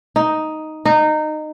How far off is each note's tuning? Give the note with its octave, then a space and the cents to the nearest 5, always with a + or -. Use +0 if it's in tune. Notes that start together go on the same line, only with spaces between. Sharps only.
D#4 +5
D#4 -20